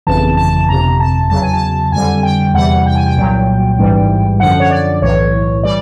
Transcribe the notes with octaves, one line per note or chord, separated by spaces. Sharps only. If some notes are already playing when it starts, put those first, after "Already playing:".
G1 F2 C#3 E3 A5
A5
G1 F2 C3 A#5
A5
E2 C#3 F#3 A5
G#5
A5
F2 D3 G3 G#5
G5
E2 C3 E3 G3 F#5
G5
G#5
G5
C2 A#2 F#3
A1 G#2 E3 G3
F#2 D3 F3 F#5
C#5
D5
B1 A2 E3 C#5
E3 G3 D5